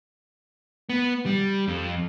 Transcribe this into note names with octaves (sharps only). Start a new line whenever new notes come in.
B3
G3
F2